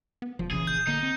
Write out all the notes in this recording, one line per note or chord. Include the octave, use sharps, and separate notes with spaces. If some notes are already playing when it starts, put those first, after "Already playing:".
B3
F1 F3
A#1 C#3 E3 G#4
G6
D3 A#3 D#4
C4